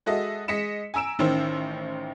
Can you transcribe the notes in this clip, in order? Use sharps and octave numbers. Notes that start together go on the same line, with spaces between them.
G#3 F#4 A4 D#5 E5
G#3 D#5 B6 C#7 E7
G#5 A#5 E6 D7 E7
A1 D#3 C#4 C5 E6